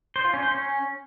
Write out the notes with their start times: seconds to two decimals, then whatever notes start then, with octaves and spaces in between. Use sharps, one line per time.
0.16 C5
0.25 F4
0.34 C#4
0.43 C5
0.52 C#4